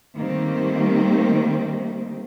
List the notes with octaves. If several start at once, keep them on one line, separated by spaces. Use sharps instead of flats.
D#3 G3 A3 A#3 C4